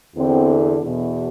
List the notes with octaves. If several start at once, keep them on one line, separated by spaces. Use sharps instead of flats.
E2 D3 C4
E2 B2